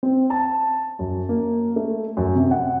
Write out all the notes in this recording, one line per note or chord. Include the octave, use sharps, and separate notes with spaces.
C4
A5
F#2
A#3
A3
F#2
C3
F#5